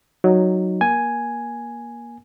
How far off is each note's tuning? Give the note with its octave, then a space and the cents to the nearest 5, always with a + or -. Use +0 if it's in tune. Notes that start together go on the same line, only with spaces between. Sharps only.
F#3 +0 D#4 +0
A#3 +20 G#5 +0